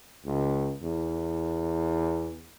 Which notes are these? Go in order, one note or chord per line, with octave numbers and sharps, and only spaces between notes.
C#2
E2